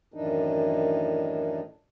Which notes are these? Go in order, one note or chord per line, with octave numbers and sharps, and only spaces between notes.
F#2 A2 D#3 E3 D4 D#4